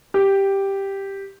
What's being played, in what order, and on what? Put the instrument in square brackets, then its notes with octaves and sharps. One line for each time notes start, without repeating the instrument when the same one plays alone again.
[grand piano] G4